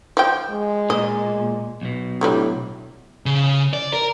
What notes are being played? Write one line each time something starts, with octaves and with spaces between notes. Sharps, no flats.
F3 G5
G#3
A#2 D#5
B1 B2
A2 D3 F#3 G3
C#3
D5
A#4